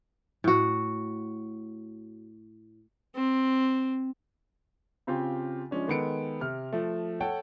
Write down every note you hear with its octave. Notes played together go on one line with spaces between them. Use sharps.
A2 F#4
C4
C#3 C4 F4 G4
F3 G#3 C#4 D4
D#3 G#3 B3 A4 C#7 D7
C3 F6
F3 A3
A4 C#5 F#5 G5 A5